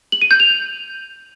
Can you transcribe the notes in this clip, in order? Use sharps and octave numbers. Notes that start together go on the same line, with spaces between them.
F#7
D#7
G6
F7